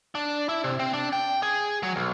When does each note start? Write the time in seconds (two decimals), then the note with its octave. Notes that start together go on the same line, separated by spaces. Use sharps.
0.15 D4
0.49 E4
0.64 C3
0.79 C4
0.94 D4
1.13 G5
1.43 G#4
1.83 F#3
1.96 B1